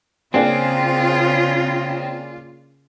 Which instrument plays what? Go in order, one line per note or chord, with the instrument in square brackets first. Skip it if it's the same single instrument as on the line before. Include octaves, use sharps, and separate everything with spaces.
[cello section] C#3 [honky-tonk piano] A#3 D4 G#4 [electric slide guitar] C4 [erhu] F4